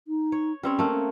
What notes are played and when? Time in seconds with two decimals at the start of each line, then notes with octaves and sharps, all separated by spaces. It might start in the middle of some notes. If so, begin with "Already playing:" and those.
0.08 D#4
0.32 C#5
0.63 G3 C4 C#4 C#5
0.79 A3 A#3
0.91 C#4